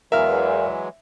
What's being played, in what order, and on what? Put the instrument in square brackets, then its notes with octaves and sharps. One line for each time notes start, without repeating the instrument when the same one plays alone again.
[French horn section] E2 [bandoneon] E3 F#3 G#3 [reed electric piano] A#4 F5 F6 [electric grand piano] E5